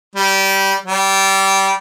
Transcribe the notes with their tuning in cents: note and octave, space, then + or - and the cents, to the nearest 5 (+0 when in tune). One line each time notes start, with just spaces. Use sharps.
G3 -15
G3 -20